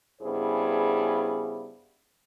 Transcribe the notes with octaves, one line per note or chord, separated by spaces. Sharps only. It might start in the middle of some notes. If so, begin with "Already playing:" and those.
G2 C#3 B3 E4 G#4 C5